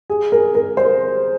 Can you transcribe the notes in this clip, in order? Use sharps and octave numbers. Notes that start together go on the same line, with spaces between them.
G#4
A#4
A#4
C5